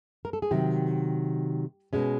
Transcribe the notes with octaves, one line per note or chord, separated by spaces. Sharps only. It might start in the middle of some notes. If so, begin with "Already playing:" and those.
A#4
A4
G#4
C3 D#3 F#3 G4
B2 G#3 C#4